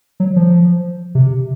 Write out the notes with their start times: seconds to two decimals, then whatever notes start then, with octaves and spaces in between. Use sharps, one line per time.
0.20 F#3
0.36 F3
1.15 C3